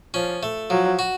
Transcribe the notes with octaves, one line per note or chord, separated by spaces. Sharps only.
F3 C#4
A3
F3 F#3
F#4